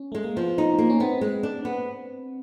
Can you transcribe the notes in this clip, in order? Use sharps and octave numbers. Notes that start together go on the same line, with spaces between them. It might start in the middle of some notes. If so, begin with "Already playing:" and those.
Already playing: C#4
G#3 A3
A#3
F3 B3
D#4
A#3
C#4
B3 C4
G#3
D4
B3